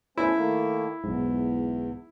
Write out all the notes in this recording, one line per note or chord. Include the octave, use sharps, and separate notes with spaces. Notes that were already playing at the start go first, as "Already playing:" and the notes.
A3 C#4 E4 C5
D#3 A3 A#3
B1 E2 G#2